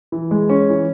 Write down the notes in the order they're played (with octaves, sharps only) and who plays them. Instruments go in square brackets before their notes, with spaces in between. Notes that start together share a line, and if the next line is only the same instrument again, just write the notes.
[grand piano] E3
G#3
C#4
E3